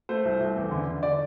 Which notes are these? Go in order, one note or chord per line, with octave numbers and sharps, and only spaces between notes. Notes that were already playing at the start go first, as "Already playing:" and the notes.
A3 C5
C2
C2
E2
D3
D3
D5